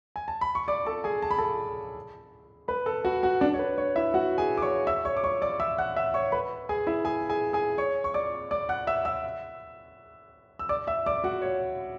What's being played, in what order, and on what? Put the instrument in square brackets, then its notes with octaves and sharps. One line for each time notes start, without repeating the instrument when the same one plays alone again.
[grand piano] G#5
A5
B5
C#6
D5 D6
A4 A5
G#4 G#5
A5
B5
A4 A5
B4 B5
A4 A5
F#4 F#5
F#4 F#5
D4 D5
C#5
B4
C#5
E4 E5
F#4 F#5
G#4 G#5
D6
C#5 C#6
E5 E6
C#5 C#6
D6
C#5 C#6
D5 D6
E5 E6
F#5 F#6
E5 E6
C#5 C#6
B4 B5
G#4 G#5
E4 E5
G#4 G#5
G#4 G#5
G#4 G#5
C#5 C#6
C#6
D5 D6
D5 D6
F#5 F#6
E5 E6
E5 E6
E6
D5 D6
E5 E6
D5 D6
F#4 F#5
C#5